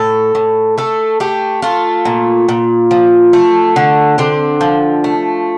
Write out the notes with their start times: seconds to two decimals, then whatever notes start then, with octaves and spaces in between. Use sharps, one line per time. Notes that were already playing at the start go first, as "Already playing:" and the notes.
Already playing: A2 A4
0.35 A2
0.78 A3 A4
1.20 A3 G4
1.62 A3 F4
2.05 A#2
2.48 A#2
2.91 F3
3.33 A3
3.76 D3
4.18 D3 C4
4.61 F3
5.04 A3